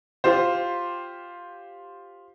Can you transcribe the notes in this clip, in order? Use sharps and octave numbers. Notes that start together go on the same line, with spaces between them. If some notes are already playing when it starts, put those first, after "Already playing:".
F4 G4 C5